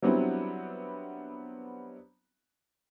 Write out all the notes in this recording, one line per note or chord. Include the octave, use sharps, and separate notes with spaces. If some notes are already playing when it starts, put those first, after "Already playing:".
F#3 G3 B3 C4 D4 E4